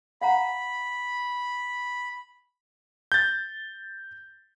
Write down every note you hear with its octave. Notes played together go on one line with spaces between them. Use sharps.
F5 F#5 A#5 B5
G6 A6